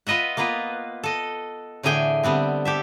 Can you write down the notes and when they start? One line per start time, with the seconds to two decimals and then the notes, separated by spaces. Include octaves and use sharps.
0.07 F4 B4 D#5 E5 F#5
0.37 A#3 B3 F4 B4
1.04 A4 D#5
1.83 A2 D3 E3 G#4 G5 G#5
2.23 D3 G3 B3 C4
2.65 G4 A4 E5